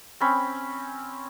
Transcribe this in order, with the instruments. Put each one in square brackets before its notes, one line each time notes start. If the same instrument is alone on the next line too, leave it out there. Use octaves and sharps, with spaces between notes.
[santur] C4 C#4 B5